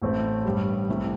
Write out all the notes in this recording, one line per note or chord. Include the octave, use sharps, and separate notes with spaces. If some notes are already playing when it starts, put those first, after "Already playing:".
A1 A2 A3 C4 E4
A1 G2 G3
C2 C3 A3 E4